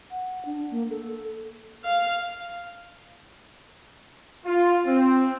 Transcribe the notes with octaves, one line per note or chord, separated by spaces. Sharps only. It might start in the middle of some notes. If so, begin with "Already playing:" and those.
F#5
D4
A#3
A4
F5
F4
C4